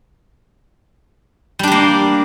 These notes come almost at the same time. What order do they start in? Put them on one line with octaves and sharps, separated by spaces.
G3 D4 G4 A#3